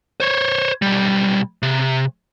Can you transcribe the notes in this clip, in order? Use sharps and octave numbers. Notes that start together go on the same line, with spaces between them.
C5 C#5
B1 G3
C3